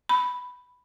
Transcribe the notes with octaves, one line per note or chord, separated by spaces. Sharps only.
B5